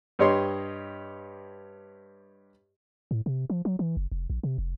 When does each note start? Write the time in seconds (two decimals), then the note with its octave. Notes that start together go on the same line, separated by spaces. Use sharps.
0.19 G2 G4 C#5 D#5 C6
3.11 A2
3.26 C3
3.50 F3
3.65 F#3
3.79 E3
3.97 F#1
4.12 F1
4.30 A#1
4.43 C3
4.58 F1